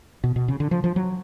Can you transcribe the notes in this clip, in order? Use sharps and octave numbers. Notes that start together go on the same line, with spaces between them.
B2
B2
C#3
D3
F3
F3
F#3